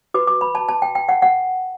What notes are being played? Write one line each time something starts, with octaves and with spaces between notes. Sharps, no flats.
F#4 B4 D6
D6
B5
A5
A5
G5
G5
F#5
F#5